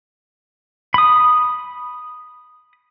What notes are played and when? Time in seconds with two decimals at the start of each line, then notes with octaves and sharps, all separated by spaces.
0.94 B5 D#6